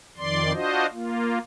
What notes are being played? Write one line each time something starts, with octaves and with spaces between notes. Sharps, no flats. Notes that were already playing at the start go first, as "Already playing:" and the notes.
F2 D#3 D5 C6
D4 F4 F#4 C5 D#5
A#3 F4